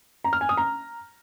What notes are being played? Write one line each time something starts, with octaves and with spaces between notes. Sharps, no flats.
A#5
F6
G#5
D#6
A#5